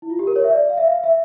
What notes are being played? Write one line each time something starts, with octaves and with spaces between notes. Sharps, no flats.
E4
F4
G4
A#4
C#5
E5
D5
F5
E5
F5
E5